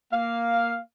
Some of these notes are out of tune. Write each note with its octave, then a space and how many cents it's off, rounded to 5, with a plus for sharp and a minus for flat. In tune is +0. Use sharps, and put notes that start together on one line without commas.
A#3 +0 F5 +0